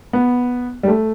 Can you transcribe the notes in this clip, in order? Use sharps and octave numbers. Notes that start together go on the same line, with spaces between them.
B3
G3
A3